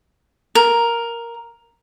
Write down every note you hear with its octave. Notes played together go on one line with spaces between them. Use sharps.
A#4